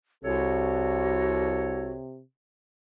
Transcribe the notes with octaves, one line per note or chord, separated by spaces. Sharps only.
C2 C3 F#4 A4 C#5